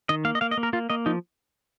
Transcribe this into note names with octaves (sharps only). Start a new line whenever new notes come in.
D#3 D#5
A#3 F5
D#5
A#3 F5
D#5
A#3
A#4
A#3 F4
A#3 D#5
F3 D#4